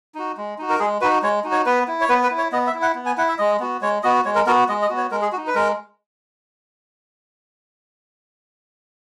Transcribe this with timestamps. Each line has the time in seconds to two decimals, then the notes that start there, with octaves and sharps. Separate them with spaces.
0.15 D#4 F#4
0.37 G#3
0.58 D#4 F#4
0.70 A#4
0.79 G#3 G#4
1.01 D#4 F#4 B4
1.23 G#3 C#5
1.44 D#4 F#4
1.52 C#5
1.66 B3 B4
1.88 E4
2.01 C#5
2.09 B3 B4
2.23 B4
2.31 E4
2.38 C#5
2.52 B3 D#5
2.67 E5
2.74 E4
2.82 F#5
2.95 B3
3.06 G#5
3.18 E4 F#5
3.28 E5
3.38 G#3 D#5
3.60 B3 F#4
3.81 G#3 C#5
4.03 B3 F#4 D#5
4.25 G#3 C#5
4.35 A#4
4.47 B3 F#4 A#4
4.69 G#3 D#5
4.82 D#5
4.90 B3 F#4
4.97 C#5
5.11 G#3 A#4
5.22 G#4
5.32 F#4
5.37 D#4
5.47 B4
5.55 G#3 A#4